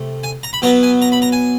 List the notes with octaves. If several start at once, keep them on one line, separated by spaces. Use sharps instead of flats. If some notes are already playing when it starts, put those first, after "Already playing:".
Already playing: C3 A3
G#5
A#5
B5
B2 F#3 B3 A#5
G#5
A#5
B5
A#5
G#5